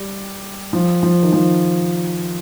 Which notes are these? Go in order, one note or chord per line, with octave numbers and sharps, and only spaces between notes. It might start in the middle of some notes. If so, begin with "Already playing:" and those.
Already playing: G3
F3
F3
D#3
F3